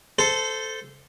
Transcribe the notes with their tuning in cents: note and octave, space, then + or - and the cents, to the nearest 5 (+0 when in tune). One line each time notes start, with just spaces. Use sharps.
A4 +0 C5 -15